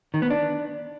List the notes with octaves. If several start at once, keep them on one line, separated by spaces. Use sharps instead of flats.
D#3
B3
D4